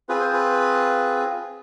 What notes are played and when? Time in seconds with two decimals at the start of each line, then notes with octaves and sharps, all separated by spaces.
0.09 C4 F4 G#4 B4
0.20 C5
0.33 B4